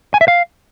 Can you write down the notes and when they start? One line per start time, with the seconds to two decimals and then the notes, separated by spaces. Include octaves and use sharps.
0.14 G#5
0.21 E5
0.28 F5